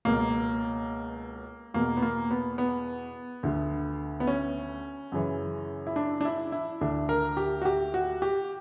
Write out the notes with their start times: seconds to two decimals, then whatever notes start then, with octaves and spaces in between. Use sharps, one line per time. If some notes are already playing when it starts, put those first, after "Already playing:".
0.05 C#2 B2 A#3
1.74 E2 B2 A#3
1.97 B3
2.02 A#3
2.30 B3
2.58 B3
3.43 D2 D3
4.20 B3
4.27 C#4
5.12 F#2 C#3 E3
5.87 E4
5.96 D4
6.21 D4
6.25 E4
6.52 E4
6.81 D2 D3 D4
7.09 A#4
7.37 G4
7.62 F#4
7.65 G4
7.94 F#4
8.22 G4